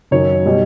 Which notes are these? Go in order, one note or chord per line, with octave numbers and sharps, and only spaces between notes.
F#2 D#3 F#3 C#5
B2 G3